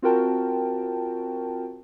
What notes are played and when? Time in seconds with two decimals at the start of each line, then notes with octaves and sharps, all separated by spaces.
0.02 C4 F4 F#4 A#4 G5 A5